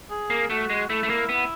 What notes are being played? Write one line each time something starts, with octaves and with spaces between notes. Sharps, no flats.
G#4
A#3
A3 F#4
G#3
A3 E4
A3
A#3
B3